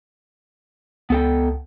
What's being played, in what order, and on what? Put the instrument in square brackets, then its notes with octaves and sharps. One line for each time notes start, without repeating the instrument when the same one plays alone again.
[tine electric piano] C#2 [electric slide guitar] B3 A4 G5